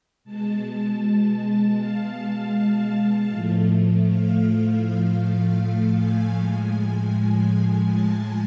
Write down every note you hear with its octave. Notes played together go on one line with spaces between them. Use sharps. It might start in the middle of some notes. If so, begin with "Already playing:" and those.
B2 G#3 A5
F5
A2 F3 A3
F5
F5
G#5
A2 F3 G#3
A5